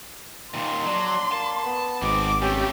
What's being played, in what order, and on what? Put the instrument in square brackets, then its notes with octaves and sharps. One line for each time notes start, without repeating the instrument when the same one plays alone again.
[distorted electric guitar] D#2 A#2 [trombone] D#3 [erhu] C6
[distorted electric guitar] F#3 [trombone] D4
[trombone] A#3 [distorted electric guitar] A5
[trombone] B3
[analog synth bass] G#1 [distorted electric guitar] G#2 C4 [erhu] D6
[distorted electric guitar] C#3 A3 [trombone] C#4 [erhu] G4